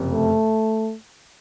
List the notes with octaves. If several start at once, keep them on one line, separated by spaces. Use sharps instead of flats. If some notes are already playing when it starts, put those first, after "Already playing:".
Already playing: F#1 F2 C3
A3